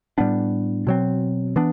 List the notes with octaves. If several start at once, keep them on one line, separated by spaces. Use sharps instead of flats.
A2 G3 B3 D4
B2 F#3 C4
E3 B3 D4